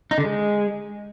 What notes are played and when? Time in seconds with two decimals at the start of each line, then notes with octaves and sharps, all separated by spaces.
0.11 D#4
0.18 D3
0.25 G#3